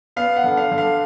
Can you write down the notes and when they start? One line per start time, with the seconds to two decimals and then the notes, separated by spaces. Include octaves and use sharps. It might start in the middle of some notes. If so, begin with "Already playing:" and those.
0.16 B3 F5
0.37 F#5
0.44 D3
0.57 F5
0.71 D3
0.78 F5